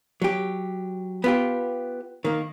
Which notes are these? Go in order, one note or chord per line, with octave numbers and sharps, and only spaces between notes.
F#3 G4
B3 F4 G4
D#3 A#3